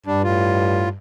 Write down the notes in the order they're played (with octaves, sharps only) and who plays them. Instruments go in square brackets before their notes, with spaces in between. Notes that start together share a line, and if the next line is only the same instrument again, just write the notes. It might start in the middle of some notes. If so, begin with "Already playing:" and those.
[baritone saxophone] G2 [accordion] G3 D4
[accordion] A2 F4